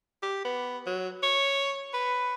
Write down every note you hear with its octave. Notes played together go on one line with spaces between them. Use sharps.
G4
B3
F#3
C#5
B4